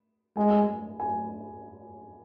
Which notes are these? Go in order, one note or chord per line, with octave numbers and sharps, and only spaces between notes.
G#3 G#5
G#5
G#5